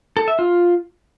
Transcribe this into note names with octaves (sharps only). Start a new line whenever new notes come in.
A4
E5
F4